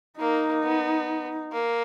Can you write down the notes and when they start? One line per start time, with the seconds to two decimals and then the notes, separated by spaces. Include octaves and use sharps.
0.20 A#3 D#4
0.64 B3
1.52 A#3